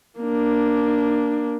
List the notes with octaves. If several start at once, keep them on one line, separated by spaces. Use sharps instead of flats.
A#3 D4